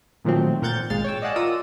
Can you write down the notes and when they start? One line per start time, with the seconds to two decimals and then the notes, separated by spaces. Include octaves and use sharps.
0.25 A#2 D#3 F3 F#3 A3 C4
0.62 A#2 A#4 F#5 G6 A6
0.90 G#1 A#2 G#3 F5 F6 A6
1.04 C#5 G5 E6
1.22 D5 D#5 F5 F#5 G#5 A5
1.36 F4 A#4 D5 D#5 D#6 E6